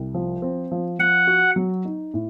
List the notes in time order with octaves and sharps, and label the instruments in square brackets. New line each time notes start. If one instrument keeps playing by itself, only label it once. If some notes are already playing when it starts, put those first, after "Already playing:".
Already playing: [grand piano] C2
F3
C4
F3
[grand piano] F3 [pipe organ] F#5
[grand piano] F#4
F#3
D#4
A2